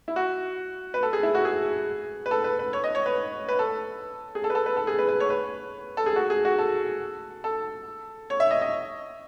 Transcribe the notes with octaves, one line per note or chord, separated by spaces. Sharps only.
E4
F#4
B4
A4
G#4
E4
F#4
G#4
B4
A4
B4
B4
C#5
D#5
C#5
B4
B4
A4
G#4
A4
B4
A4
B4
A4
G#4
B4
B4
C#5
B4
A4
G#4
F#4
G#4
F#4
A4
A4
C#5
E5
D#5
D#5